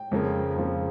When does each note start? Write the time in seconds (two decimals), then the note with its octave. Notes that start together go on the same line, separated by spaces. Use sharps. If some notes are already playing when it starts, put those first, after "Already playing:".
Already playing: G5
0.11 F2 C#3 F3 A#3
0.55 F2 C#3 F3 A#3